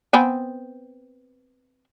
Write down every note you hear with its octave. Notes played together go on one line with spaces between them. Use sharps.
B3 C4 G#5